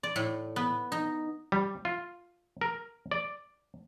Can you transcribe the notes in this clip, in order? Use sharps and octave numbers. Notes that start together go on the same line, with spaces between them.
D5
A2
B3
D#4
G3
F4
A#4
D5